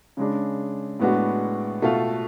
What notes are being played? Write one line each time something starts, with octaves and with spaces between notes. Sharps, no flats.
C#3 G#3 D4
A2 G#3 B3 D4 F#4
B2 A3 F4 A4 F5